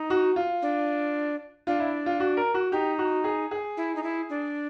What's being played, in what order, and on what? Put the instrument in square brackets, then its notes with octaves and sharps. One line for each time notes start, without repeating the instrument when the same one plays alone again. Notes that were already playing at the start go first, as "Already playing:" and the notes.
Already playing: [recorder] D#4
[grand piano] F#4
F4
[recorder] D4
[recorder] D4 [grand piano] F4
[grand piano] E4
F4
F#4
A#4
F#4
[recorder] D#4 [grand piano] G4
[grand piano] F#4
G#4
G#4
[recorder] E4
D#4
E4
D4